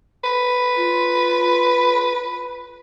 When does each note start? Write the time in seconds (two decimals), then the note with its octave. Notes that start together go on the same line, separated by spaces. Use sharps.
0.24 B4
0.76 F4